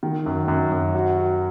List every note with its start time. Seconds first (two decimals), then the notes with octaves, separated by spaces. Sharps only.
0.03 D#3
0.26 F#2
0.48 F#2
0.72 F#2
0.95 F#4
1.17 F#4